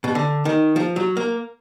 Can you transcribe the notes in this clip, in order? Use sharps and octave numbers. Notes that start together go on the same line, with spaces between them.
B2
D3
D#3
F3
F#3
A#3